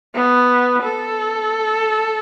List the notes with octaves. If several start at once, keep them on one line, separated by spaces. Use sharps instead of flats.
B3
A4